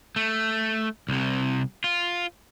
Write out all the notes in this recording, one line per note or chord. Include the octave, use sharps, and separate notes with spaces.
A3
C2 C3
F4